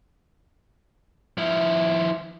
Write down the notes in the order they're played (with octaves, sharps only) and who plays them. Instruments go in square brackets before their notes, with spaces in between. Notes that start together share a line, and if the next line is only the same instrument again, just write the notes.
[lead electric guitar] F3 E4